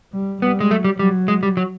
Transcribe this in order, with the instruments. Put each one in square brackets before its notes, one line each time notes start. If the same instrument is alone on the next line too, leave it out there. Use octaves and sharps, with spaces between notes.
[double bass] G3
[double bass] G3 [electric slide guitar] B3
[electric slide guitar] G#3
[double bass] F#3 [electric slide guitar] A3
[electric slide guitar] G3
[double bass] F#3 [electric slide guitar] G3
[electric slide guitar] G#3
G3
F#3